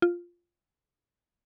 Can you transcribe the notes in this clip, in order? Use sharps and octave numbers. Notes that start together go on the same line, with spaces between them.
F4